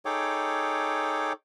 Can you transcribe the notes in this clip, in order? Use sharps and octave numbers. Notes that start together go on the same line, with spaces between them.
D#4 G#4 A4 C#5 G5 D6